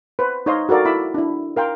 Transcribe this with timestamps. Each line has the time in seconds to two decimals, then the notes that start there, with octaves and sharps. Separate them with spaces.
0.19 B4 C5
0.46 D#4 C5 C#5 D#5 F5 C6
0.69 F#4 A4 A#4 D5 F5
0.85 E4 B5 D6 E6
1.14 D4 E4
1.56 A#4 F5 G5 C6